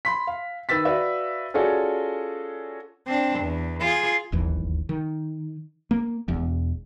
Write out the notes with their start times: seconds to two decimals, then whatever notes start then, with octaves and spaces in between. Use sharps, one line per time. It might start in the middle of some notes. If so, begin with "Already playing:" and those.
0.05 B5 C6 B6
0.27 F5
0.69 D#3 B4 E6 A6 B6
0.85 F#4 B4 D5 E5 F5
1.54 C#4 F4 F#4 G#4 A4 D5
3.06 C4 D4
3.39 E2
3.80 F4 G#4
4.32 D1 G1 D#2 E3
4.89 D#3
5.91 A#3
6.28 E1 E2